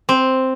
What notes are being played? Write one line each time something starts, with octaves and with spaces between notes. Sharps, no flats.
C4